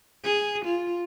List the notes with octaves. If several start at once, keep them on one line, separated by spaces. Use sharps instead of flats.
G#4
F4